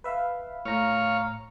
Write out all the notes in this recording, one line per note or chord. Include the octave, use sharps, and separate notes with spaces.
B4 E5 F5
A2 C#5 F5 A#5